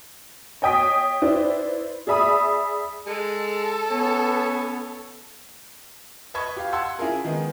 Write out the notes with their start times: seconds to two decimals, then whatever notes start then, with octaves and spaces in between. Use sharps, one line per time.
0.62 C#5 D#5 G5 D#6 B6
1.22 D#4 E4 B4 C5 D5
2.07 G#4 D5 E5 B5 D#6
3.07 G#3 A4
3.90 B3 C#4
6.34 B4 D#5 A5 B5 C#6 G#6
6.57 G4 F5
6.73 F#5 A5 C6 E6 G#6
6.99 C#4 E4 F4 G#4 A#4
7.25 D#3 G#3 B3 G#4